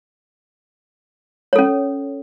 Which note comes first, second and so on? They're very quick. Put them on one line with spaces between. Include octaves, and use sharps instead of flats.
C#5 A4 C#4